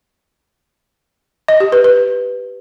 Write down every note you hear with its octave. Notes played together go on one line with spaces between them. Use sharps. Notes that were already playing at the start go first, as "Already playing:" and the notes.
D#5
G4
B4
B4